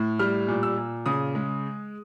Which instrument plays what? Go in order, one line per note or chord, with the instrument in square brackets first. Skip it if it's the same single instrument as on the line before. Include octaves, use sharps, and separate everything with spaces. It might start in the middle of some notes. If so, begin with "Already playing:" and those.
Already playing: [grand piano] A2
G3 F6
A#2
E6
A#2
C#3 D#6
G#3